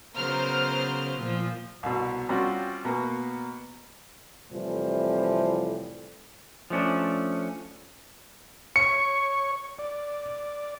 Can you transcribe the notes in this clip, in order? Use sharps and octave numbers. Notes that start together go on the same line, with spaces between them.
C#3 F#3 B3 A#4 C5 F6
A#2 F3
C2 B2
G3 C4 C#4 F4 F#4
B2 A#3 B3
F2 A2 C3 E3 F3 G3
F3 A3 C#4 D4
C#5 C#6 C#7
D5